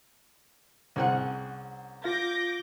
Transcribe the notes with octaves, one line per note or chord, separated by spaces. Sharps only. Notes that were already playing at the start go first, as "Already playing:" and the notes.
C2 C4 C#4 G#4 F#5
F4 F5 D6 G6 A#6